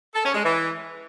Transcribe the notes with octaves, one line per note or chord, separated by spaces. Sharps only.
A4
C#4
G#3
E3